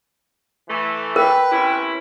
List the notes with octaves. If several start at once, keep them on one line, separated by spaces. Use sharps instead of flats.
E3 A3
A#4 B4 G5
C3 C#4 E4